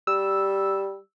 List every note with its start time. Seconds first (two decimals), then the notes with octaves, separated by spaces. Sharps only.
0.07 G3 E6